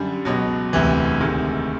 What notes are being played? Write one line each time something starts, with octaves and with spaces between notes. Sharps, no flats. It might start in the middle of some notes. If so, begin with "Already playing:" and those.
Already playing: F#2 D3 G3
C#2 B2 F#3
E1 D2 C3 E3
D2 C3 D#3 G#3